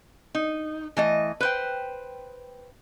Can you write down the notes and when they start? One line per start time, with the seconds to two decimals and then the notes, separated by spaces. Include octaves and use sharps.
0.35 D#4
0.97 E3 A3 D#5
1.40 B4 C5 G5